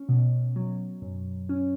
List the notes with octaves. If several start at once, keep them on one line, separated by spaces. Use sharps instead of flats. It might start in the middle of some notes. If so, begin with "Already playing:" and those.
Already playing: C#4
B2
F#3
F#2
C#4